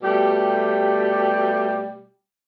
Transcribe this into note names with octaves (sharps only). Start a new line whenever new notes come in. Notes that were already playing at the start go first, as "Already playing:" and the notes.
B2 G3 A3 G4